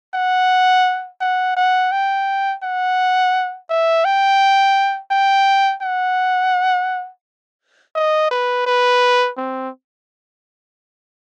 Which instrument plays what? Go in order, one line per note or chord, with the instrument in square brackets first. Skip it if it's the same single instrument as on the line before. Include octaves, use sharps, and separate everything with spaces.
[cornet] F#5
F#5
F#5
G5
F#5
E5
G5
G5
F#5
D#5
B4
B4
C4